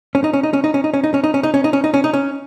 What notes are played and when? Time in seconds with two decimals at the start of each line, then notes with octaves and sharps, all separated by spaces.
0.15 C#4
0.24 D#4
0.33 C#4
0.43 D#4
0.53 C#4
0.64 D#4
0.74 C#4
0.84 D#4
0.94 C#4
1.04 D#4
1.14 C#4
1.24 D#4
1.34 C#4
1.43 D#4
1.54 C#4
1.64 D#4
1.73 C#4
1.84 D#4
1.94 C#4
2.04 D#4
2.13 C#4